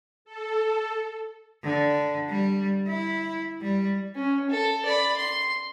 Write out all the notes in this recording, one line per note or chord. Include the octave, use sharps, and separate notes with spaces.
A4
D3
G3
E4
G3
C#4
A4
D5 B5
C6